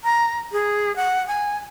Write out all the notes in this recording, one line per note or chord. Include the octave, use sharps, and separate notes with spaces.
A#5
G#4
F#5
G#5